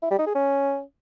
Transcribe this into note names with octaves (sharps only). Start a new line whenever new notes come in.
E4
G3
D#4
G#4
C#4